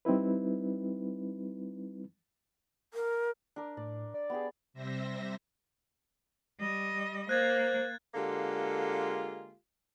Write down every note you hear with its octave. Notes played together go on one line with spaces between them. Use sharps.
G3 C4 D#4 E4 B4
A#4
D4 A#4
A2 D5
D5
B3 G4 G#4
C3 G3 C5 E5 A#6
G3 D#5
A#3 C5 F#6 G#6 A6
D3 G#3 A#3 F4 G4 A4